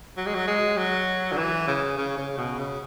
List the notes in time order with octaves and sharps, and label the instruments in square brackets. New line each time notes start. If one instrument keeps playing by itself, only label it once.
[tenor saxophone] F#3
G#3
F#3
G#3
F#3
D3
E3
C#3
C#3
C#3
B2
C#3